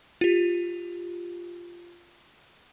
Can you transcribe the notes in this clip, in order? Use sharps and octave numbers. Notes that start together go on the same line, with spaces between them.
F4 G4